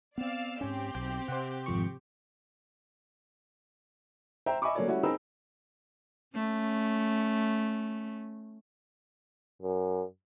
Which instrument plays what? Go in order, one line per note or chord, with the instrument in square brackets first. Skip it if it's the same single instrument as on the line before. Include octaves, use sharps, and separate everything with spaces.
[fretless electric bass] B3 C4 [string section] D5 F5 E6
[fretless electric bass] G#2 C#4 [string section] C4 G4
[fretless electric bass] B1 [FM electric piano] G5
[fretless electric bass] C3 [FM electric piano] C5 F#5
[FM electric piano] G#1 F2 C#6
[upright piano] C5 E5 G5 A#5
D#5 E5 G#5 B5 C#6 D6
F#3 A#3 C#4 A4 C#5 D5
G3 A3 C#4 E4 F#4
C4 D#4 G#4 A#4 B5 E6
[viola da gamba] A3 C#4
[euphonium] F#2